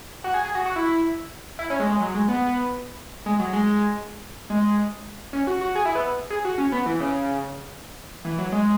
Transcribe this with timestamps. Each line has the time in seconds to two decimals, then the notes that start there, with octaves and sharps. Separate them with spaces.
0.24 F#4
0.34 G#4
0.45 G#4
0.55 F#4
0.66 F#4
0.76 E4
1.59 E4
1.70 C#4
1.80 G#3
1.90 G#3
2.00 F#3
2.14 G#3
2.28 B3
3.26 G#3
3.39 F#3
3.53 G#3
4.50 G#3
5.33 C#4
5.47 F#4
5.61 F#4
5.75 G#4
5.85 E4
5.95 B3
6.30 G#4
6.45 F#4
6.58 C#4
6.72 B3
6.86 E3
7.00 C#3
8.25 E3
8.39 F#3
8.52 G#3